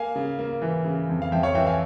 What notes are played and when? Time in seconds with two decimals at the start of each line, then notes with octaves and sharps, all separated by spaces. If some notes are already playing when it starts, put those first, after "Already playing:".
Already playing: A#3 F5 G#5
0.16 C#3
0.39 A#3
0.62 E3
0.85 C#3
1.09 F2
1.22 F5
1.32 F2 E5 G5
1.43 C#5 F5
1.55 E3 E5 G5
1.66 F5 G#5